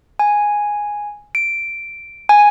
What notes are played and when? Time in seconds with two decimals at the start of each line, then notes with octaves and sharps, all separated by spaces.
0.19 G#5
1.35 D7
2.29 G#5